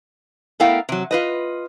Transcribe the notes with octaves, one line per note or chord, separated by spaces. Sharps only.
A3 B3 E4 A#4 F5 G5
C3 F#3
F4 B4 D#5